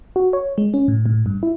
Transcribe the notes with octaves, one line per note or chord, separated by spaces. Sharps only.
F#4
C#5
G#3
C#4
A2
A2
G2
E4